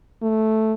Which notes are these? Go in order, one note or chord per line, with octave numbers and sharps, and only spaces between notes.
A3